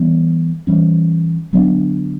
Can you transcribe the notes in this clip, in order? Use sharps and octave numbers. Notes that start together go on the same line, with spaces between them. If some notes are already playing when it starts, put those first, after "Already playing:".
Already playing: E3 G3 B3
E3 G3 C#4
D3 F#3 B3 D4